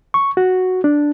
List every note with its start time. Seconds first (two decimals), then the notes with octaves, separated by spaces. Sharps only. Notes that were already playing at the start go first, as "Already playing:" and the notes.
0.14 C#6
0.37 F#4
0.84 D4